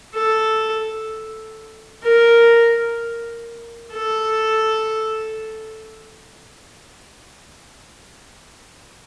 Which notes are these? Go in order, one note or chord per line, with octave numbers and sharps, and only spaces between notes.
A4
A#4
A4